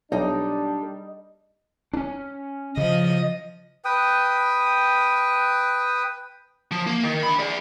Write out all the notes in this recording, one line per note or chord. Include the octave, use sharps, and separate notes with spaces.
B1 G3 D4 D#4
C#4 D4
C#3 F3 D#5
B4 G5 D#6
F3
A#3
D#3
D4 B5
G#4 D5